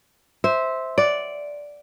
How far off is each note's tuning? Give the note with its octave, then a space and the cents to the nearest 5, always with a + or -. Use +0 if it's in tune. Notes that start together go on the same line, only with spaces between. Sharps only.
C5 +0 E5 -15
D5 -5 F#5 +0